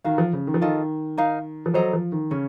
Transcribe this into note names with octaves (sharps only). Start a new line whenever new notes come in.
D#3 F#4 A#4 F5
F3
C#3
D#3
F3
D#3 F4 A4 D#5
D#4 A#4 F5
F3
F#3 A4 C5 D#5 A#5
F3
D#3
C#3 C#4